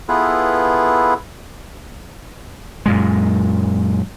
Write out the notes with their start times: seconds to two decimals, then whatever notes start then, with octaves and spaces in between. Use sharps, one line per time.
0.09 B3 E4 F4 G#4 A4 B4
2.86 F#2 A#2 G#3